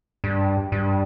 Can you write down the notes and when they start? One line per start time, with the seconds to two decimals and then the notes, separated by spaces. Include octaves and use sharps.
0.24 G2
0.72 G2